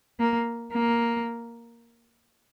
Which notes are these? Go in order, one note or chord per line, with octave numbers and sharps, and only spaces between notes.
A#3
A#3